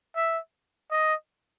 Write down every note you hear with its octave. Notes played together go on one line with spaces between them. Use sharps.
E5
D#5